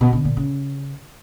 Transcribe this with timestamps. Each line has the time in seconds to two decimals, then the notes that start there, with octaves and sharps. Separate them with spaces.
0.01 B2
0.13 D3
0.25 A#2
0.37 C#3